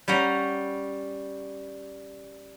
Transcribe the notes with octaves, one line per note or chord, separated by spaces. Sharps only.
G3 C#4 F#5 A#5